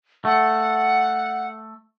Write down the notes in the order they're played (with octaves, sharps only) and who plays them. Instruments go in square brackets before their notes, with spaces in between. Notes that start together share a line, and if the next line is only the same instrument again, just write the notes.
[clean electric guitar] A3 [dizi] F#5